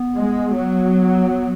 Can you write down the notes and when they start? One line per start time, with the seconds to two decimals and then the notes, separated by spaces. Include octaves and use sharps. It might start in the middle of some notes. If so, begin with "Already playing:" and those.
Already playing: B3
0.16 G#3
0.54 F#3